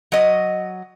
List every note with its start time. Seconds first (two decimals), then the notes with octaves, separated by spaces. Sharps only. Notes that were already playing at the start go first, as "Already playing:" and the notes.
0.12 F#3 D#5